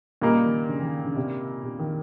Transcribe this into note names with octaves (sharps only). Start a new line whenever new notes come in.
A#2 C#3 G3 A#3 D#4 A#4
D#3
C#3
D#3
C#3
C3
C3
D#3